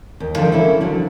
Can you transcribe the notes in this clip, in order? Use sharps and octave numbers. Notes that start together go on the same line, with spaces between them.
D#2
D3 D#3 F3 A4 F5
F#3 A#3 C#4 E4 A4
D3 F3 F#3